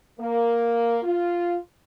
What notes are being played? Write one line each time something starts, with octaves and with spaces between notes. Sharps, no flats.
A#3
F4